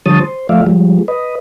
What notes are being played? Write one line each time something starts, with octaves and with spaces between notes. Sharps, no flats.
D3 F3 G3 C#5 A5 D#6
C5
F3 A3 D5 E5 F5
F3 G3 G#3
B4 D#5